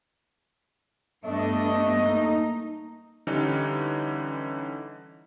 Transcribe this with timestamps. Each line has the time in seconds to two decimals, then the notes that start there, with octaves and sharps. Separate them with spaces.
1.24 G2 A3 B3 D4 D#5
1.99 A#3 D#4
3.27 D3 E3 G3 C#4 D#4